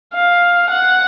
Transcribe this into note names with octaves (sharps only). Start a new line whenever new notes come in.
F5
F#5